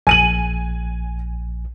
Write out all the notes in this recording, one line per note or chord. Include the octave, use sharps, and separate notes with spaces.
A#1 G#5 D#7 F#7